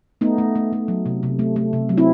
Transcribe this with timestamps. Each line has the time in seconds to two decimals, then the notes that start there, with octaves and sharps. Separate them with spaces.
0.21 A3 B3 D#4
0.38 A3
0.55 A3
0.73 A3
0.88 F#3
1.06 C3
1.23 C3
1.39 A3
1.56 A3
1.73 C3
1.89 F#3
1.98 C4 E4